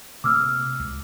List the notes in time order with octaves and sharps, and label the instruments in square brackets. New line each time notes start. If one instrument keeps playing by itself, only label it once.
[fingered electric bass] C3 A3 A#3 [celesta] D6 E6 F6
[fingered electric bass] C#2